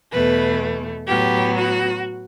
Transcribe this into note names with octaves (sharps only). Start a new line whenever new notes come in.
E2 B2 A3 B4
A2 F#3 B3 G4
F#4